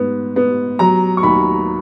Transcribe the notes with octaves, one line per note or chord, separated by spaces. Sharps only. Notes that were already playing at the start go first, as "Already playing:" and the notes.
Already playing: G#2 B3
B3
F#3 A#5
C#6
D#2 B5